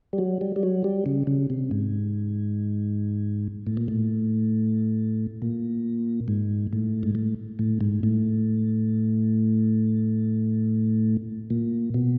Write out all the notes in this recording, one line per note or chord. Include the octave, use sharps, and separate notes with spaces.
G3
F#3
G3
G3
F#3
G3
C#3
C#3
C3
G#2
A2
A#2
A2
A#2
G#2
A2
G#2
A2
A2
G#2
A2
A#2
B2